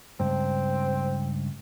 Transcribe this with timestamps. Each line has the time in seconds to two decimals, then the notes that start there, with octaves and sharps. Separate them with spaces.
0.20 C#2 G2 C4